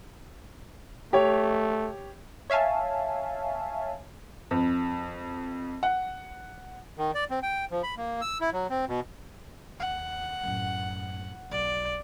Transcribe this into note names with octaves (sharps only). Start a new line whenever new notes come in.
A3 G4 C#5
C#5 E5 F5 G#5 A5
F2
F#5
D#3
D5
C4
G5
F3
B5
A#3
E6
E4
F#3
C4
B2
D#2 F#5
F#2 A2
B1 D5